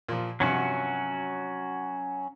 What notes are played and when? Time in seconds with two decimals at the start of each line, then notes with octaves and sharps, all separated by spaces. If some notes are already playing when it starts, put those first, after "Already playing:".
0.09 A#2 F3
0.40 G2 C3 F3 F#3 C#4 F#4